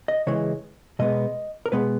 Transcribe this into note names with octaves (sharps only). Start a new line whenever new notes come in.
D#5
C#3 E3 G#3 C#5
B2 G#3 B3 D#5
A#4
B2 G#3 B3 B4